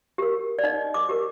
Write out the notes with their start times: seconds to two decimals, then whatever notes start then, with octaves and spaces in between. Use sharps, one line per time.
0.18 G4 A#4
0.59 D5
0.64 D#4 D#5
0.94 D6
1.09 G4 A#4